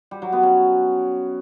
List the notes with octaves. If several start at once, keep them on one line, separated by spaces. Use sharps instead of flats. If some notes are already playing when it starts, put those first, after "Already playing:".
G3
F#3
B3
C#4